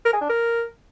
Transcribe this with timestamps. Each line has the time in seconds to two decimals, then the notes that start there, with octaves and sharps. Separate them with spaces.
0.05 A#4
0.13 G#4
0.21 D4
0.29 A#4